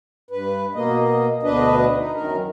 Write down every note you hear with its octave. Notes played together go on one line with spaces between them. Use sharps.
G2 B4
B2 A#3 D#5
D2 B2 D4 B4 D#5
D#4
F#2 D#3 A#4